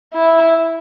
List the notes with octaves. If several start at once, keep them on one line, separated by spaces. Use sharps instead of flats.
E4